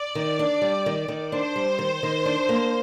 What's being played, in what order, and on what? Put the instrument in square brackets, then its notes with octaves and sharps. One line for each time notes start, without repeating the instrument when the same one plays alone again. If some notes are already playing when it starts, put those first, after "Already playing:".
Already playing: [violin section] D5
[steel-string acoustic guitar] D#3
D4
G3
D#3
D#3
[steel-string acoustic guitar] D4 [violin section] C5
[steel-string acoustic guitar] G3
D#3
D#3
D4
A#3